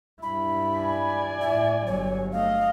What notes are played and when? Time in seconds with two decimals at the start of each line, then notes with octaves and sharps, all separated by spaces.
0.23 G2 E4 B5
0.76 D5 G#5
1.41 A2 E4 E5
1.87 G1 F#3 C#5
2.32 A3 D#5 F5